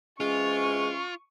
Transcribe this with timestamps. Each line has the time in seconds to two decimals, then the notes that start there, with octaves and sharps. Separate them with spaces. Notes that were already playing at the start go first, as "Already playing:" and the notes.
0.20 C3 E3 G#3 C#4 F4 C#6